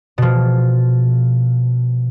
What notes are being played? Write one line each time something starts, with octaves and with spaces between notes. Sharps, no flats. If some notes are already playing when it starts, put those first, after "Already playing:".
B2 F3